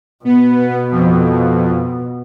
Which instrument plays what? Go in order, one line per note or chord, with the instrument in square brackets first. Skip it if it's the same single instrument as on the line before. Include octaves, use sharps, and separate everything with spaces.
[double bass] B2 [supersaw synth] B3
[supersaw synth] F2